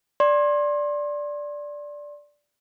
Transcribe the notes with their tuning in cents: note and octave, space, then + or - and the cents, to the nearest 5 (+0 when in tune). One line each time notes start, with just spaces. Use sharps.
D5 -5 C6 +30